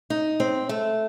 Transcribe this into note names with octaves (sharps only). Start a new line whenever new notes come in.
D#4
C4
A3